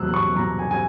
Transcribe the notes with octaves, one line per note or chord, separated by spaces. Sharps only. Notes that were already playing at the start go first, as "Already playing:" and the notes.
Already playing: E2 F#3 E6 F#6
C#6
F#3 A#5
G#5
G#5